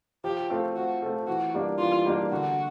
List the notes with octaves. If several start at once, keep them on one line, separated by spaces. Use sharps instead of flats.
F3 G4
A3 C4 F4 A4
F3 F#4
A3 C4 F4 A4
E3 F#4
G3 A#3 D4
E3 F4
G3 A#3 D4
D3 F#4